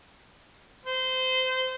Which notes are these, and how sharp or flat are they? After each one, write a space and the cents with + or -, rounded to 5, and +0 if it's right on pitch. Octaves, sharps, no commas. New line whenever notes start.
C5 -20